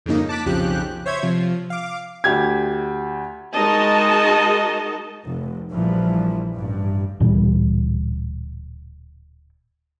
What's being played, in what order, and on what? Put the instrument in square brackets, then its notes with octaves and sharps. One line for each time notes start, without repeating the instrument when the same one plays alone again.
[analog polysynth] F2 G#2 C#3 A#3 D#4
A5 D6 F#6 B6
B1 F2 C#3 F3 G4 F#6
C5 C#5 E5 G#6
C3 F3
F5 D6
[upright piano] D2 G4 G#6
[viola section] G#3 D#4 F#4 A#4 D#5 A5
[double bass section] F1
A#1 A#2 E3 F3 G3
A1 G2
[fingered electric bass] D1 A#2 E3 G3